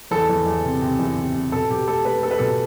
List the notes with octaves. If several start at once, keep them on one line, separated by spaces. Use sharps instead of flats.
E2 A4
E2
E2
C3
C3
E2
C3
C3
B2 A4
B2 G4
A3 A4
A3 B4
A3 A4
B4
B2 A4